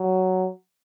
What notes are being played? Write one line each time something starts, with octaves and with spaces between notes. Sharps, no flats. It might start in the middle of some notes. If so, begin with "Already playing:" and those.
Already playing: F#3